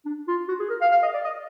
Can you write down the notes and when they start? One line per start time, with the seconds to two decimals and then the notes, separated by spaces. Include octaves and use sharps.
0.06 D4
0.28 F4
0.48 F#4
0.60 G#4
0.70 A#4
0.81 F5
0.92 F5
1.03 D#5
1.13 D5
1.24 D#5